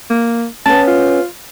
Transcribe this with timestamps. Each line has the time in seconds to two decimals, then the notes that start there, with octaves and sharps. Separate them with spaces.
0.10 A#3
0.66 B3 C#4 A5
0.88 F4